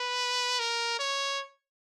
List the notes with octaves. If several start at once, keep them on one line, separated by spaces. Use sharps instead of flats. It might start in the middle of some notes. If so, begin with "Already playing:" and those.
Already playing: B4
A#4
C#5